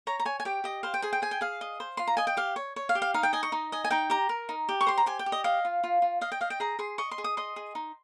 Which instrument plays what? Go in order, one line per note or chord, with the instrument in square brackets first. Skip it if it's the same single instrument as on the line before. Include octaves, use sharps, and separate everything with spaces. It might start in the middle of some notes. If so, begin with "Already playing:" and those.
[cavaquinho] C#5 A#5
A#5
C#5 G#5
G#5
G4 G5
G4 D#5
C5 F5
G5
G#4 G#5
G5
G#4 G#5
G5
G#4 F5
D#5
C5
F4 C6
A#5
D#5 G#5
G5
G4 F5
C#5
C#5
F5
G4
F5
D#4 F5
G5
D#5 G#5
C#6
D#4
D#5 G#5
G#5
D#4 G5
G4 A#5
A#4
D#4
G4
C#6
C5 C6
A#5
G4 G#5
G5
G4
D#5
D#5 F5
F4
F4
F4
D#5 F5
G5
D#5 F5
G5
G#4 A#5
G#4 C6
D#5 C#6
C6
G#4
D#6
D#5 C6
G#4
D#4